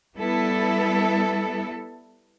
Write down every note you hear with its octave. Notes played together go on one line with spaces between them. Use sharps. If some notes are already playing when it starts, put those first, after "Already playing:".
G3 B3 E4 A4